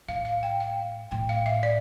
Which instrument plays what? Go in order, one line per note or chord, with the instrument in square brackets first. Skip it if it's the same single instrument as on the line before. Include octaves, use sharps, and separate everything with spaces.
[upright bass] A2 [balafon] F5
[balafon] F5
G5
F5
[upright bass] A2 [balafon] G5
[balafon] F5
E5
D5